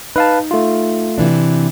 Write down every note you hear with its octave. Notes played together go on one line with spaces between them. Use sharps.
D#4 B4 F5 A5
A3 F4
C3 E3 D4